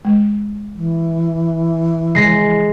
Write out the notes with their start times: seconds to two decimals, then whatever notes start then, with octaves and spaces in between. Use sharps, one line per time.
0.05 G#3
0.74 E3
2.15 G#3 A#6 C7